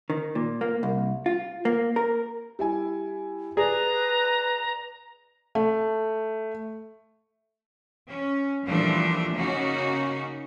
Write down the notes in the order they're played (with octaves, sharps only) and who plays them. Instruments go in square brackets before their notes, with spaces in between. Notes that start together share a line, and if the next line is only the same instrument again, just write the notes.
[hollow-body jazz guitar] D#3
A#2
A#3
C2
F4
A#3
A#4
[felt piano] G3 E4 G#5
[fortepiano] G#4 [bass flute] B4 [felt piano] D5 [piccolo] A#5
[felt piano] A3
[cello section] C#4
A#2 E3 F3 G3 A3 D4
C#3 A#3 C#4 D#4 F#4